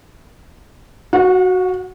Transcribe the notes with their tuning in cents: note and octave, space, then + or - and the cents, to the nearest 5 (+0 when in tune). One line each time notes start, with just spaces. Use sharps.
F#4 +0 F#5 -45